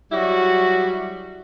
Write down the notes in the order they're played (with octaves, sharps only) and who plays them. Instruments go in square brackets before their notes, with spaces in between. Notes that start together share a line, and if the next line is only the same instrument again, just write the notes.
[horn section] F#3 G3 E4 F#4